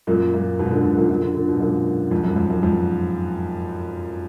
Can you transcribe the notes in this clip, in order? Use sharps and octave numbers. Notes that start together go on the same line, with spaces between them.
F#2 A#2
F#2 A#2
G#2 B2
A#2 D3
G#2 B2
F#2 A#2
F#2 A#2
A#2 D3
A#2 D3
G#2 B2
F#2 A#2
F2 G#2
F#2
F2
F#2
F2 G#2